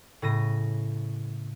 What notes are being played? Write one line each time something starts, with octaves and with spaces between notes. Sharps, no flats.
A2 C#3 A#6 D#7